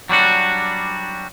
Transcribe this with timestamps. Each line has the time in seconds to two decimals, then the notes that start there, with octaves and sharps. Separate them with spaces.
0.09 F#3 G3 D4 F#4